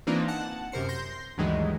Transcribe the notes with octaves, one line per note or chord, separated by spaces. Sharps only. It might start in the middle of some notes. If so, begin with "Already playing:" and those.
E3 A#3 C4 D4 D#4 F4
F#5 A5
F#2 C3 A#4 C5 C#7
C6 G6 A#6
D2 G2 D#3 E3 F#3 G#3